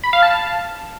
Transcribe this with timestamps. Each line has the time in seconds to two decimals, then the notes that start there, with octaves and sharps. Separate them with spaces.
0.04 B5
0.13 F5
0.22 A5